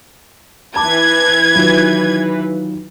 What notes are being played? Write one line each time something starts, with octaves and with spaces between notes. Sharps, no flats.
E3 B4 A5 D6 G#6
D#3 F#3 F4